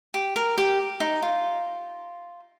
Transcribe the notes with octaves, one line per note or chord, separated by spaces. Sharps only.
G4
A#4
G4
D#4
F4